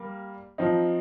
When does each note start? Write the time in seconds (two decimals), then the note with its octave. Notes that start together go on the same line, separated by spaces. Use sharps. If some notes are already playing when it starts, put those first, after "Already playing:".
Already playing: G3 A#3
0.58 F3 C4 D#4